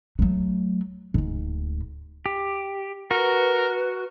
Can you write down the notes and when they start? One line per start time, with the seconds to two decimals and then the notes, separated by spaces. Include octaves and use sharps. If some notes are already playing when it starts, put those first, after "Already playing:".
0.19 F#3 A3
1.14 D1 G#2
2.26 G4
3.11 F#4 A#4 B4